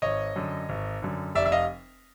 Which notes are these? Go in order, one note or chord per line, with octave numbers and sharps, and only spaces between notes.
G#1 C#5 D#5
F#2 D3
G#1
F#2 D3
F1 D5 E5
E5
D#5 F5